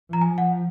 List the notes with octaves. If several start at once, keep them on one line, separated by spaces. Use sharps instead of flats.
F3 A#5
G#5
F#5